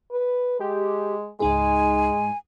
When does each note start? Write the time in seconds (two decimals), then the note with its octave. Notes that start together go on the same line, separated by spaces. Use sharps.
0.12 B4
0.60 G#3 G4
1.40 C#2 G#2 G#3 D#4 G#4 G#5